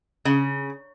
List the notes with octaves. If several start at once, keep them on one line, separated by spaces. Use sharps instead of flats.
C#3